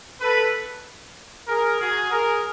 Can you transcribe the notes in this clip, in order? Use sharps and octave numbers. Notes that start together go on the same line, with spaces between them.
A4 B4
G#4 A#4
F#4 G#4
G#4 A#4